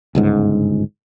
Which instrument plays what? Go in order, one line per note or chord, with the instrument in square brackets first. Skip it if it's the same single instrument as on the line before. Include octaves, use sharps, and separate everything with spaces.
[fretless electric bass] G1 C#2 G#2